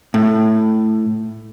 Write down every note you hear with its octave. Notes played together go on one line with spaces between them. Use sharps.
A2